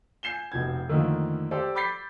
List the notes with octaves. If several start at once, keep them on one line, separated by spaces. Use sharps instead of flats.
G#5 G6 C7 E7 G7
F1 B2 G#6
F2 D3 D#3 F3 A3 A#3
G4 A4 C5 D5
B5 D6 G6 A6 B6 C7